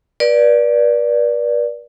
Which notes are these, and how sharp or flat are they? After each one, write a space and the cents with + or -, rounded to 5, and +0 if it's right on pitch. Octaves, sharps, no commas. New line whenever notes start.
B4 -40 D5 +0